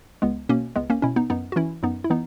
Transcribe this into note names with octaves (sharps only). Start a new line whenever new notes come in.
C#2 G#3 B3
B2 A#3 C#4
C#2 G#3 B3
A#3 C#4
B2 C#4 E4
B3 D#4
F#2 B3 D#4
F#4
E3 C#4 E4
F#2 B3 D#4
E4
E3 B3 D#4